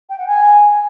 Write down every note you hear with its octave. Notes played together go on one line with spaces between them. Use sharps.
G5
F#5
G#5